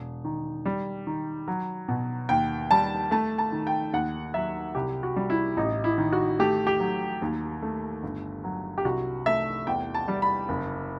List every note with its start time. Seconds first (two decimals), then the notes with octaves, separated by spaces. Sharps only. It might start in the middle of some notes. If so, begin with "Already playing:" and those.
Already playing: E1
0.24 D#3
0.65 G3
1.07 D#3
1.48 F#3
1.88 B2
2.29 D#2 G5
2.71 G3 A5
3.11 A3 A5
3.38 A5
3.52 D#3
3.67 G5
3.93 D#2 F#5
4.34 F#3 E5
4.75 C2 G4
5.03 F#4
5.16 G3
5.30 E4
5.57 A1 D#4
5.84 E4
5.98 D#3
6.13 F#4
6.39 A3 G4
6.67 G4
6.80 F#3
7.22 D#2
7.62 A3
8.03 G1
8.44 F#3
8.78 G4
8.85 C2 F#4
9.26 A3 E5
9.67 E2 G5
9.94 A5
10.08 G3
10.22 B5
10.49 F#1